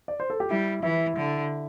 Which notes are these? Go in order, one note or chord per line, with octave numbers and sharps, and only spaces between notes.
D5
C5
A4
G4
G3 E4
E3 E4
D3